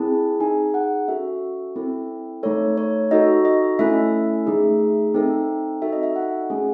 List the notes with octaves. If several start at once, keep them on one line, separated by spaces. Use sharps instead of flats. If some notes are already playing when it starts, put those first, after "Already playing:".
Already playing: C4 E4 G#4 A5
D#4 G#4 G#5
F#5
C#4 F#4 A4 E5
C4 E4 A4
A3 D#4 A4 C#5
C#5
D#4 F#4 A4 D#5
D#5
A3 C#4 E4 A4 E5
A3 D#4 G#4
C4 D#4 A4
D#4 F#4 A4 E5
D#5
E5
F#5
A3 C#4 G#4